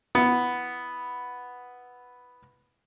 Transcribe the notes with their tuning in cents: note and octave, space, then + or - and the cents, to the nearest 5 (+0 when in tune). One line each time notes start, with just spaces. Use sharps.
B3 +0 E4 +0